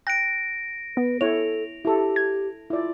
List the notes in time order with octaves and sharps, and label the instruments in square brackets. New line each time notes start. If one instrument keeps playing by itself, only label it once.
[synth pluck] G5 F#6 [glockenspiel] A#6 D7
[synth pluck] B3 [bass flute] B4
[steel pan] E4 C#5 [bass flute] A4 [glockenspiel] F7
[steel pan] E4 A4 [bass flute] G4
[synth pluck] G#6
[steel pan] E4 D5 [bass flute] F4